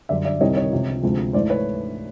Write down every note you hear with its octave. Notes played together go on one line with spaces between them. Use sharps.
F#2 D3 G3 D5 E5
D5 E5
C2 C3 D#3 G3 C#5 D#5
C#5 D#5
C#2 C3 F3
D2 C3 F3 G#3
G#2 E3 A3 C5 D5
B4 C#5